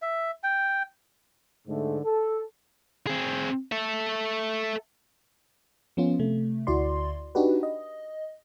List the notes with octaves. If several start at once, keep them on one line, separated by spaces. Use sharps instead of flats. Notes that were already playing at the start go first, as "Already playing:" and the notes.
E5
G5
G#2 D3 A3
A4
C4 G#4
A4 E5
F3 B3 C#4 F4
C3 A3
D2 E4 F#4 D5 C6
D4 D#4 F#4 G4 B4
D#5